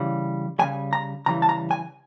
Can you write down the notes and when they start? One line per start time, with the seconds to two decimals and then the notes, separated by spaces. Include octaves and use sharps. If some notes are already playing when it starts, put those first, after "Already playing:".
Already playing: C#3 E3 G3
0.59 C#3 E3 G3 G#5
0.93 A#5
1.26 C#3 E3 G3 A#5
1.42 A5
1.49 A#5
1.71 G#5